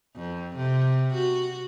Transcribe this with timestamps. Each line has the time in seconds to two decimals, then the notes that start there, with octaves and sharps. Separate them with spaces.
0.15 F2
0.56 C3
1.14 F#4